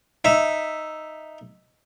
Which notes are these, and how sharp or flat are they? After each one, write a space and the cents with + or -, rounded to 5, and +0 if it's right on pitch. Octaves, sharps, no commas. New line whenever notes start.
D#4 +0 E5 +0